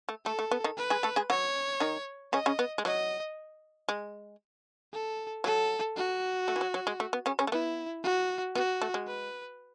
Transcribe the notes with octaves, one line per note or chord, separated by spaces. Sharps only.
A3
A3 A4
A3
B3
D#3 D#4
B4
G#3 G#4
A3 A4
G#3 G#4
F#3 F#4 C#5
D#3 D#4
C#3 C#4 D#5
C#3 C#4
B3
G#3
F#3 D#5
G#3
A4
F#3 A4
F#4
A3
E3
F#3
F#3
G#3
A3
B3
C#3 C#4
C#3 C#4
A3
B3 E4
F#4
B3 F#4
A3
G#3
B4